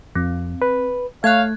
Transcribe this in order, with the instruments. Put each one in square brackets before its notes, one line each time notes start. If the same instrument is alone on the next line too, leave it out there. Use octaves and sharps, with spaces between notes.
[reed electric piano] F2 [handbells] C4
[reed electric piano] B4
[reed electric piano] A3 [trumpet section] C#5 F5 [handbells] F#6 G#6